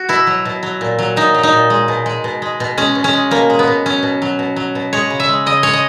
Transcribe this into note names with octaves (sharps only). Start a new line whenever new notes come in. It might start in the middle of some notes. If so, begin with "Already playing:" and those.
Already playing: F#4
B2 E4
F#3
B2
F#3
A#2
F#3
A#2 D#4
F#3
D#4
A#2
G#3
B2
G#3
B2
G#3
B2
G#3 C#4
B2
C#4
G#3
B2 A#3
G#3
B3
B2
F#3 C#4
B2
F#3
B2
F#3
B2
G#3 C#5
C#3
E5
G#3
C#3 D#5
G#3 C#5
D#5